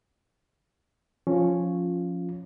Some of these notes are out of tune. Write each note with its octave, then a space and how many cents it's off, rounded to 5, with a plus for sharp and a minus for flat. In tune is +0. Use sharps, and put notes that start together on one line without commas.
F3 +10 C#4 +0 F4 +0